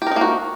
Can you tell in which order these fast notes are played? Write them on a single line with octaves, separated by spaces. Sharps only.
G4 A#4 D#4 A#3 F#4